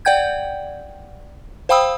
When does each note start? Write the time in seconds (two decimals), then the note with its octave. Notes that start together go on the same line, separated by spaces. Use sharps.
0.05 D5 F#5 G5 G6 G#6
1.69 C5 F5 G5 B5 D#6 E6